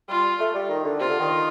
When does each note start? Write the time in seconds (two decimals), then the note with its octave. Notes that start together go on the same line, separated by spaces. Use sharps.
0.09 G3 F4
0.39 A3
0.54 G3
0.69 D#3
0.84 D3
1.00 C3 F4
1.09 D3
1.20 D#3